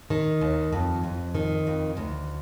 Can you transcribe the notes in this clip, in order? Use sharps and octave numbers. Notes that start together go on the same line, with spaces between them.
D#3
D#2
F2
F2
D#3
F2
D2